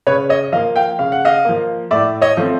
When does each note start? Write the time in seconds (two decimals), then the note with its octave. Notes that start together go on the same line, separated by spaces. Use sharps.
0.07 C#3 B4 C#5
0.29 C#5 D#5
0.52 F3 D#5 F5
0.55 A#3
0.76 F5 G5
0.99 C#3 F5
1.12 F#5
1.25 D#5 F5
1.45 F3 A#3
1.91 A2 D5 E5
2.22 C#5 D#5
2.37 F3 A3 C4